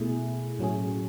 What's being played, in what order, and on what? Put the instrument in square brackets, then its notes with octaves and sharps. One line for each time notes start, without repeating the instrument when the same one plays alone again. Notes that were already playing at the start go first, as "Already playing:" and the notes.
Already playing: [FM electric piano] B2 A3 E4 G#4
A2 F#3 A3 C#4 G#4